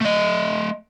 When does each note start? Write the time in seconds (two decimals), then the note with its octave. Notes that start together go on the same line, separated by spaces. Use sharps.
0.02 A3 D#5